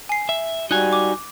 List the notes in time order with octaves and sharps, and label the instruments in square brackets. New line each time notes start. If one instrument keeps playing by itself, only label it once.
[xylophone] G#5 C7
[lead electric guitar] E5
[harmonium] G3 F#4 [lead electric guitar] D#4 G#5 [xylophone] F#6
[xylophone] D6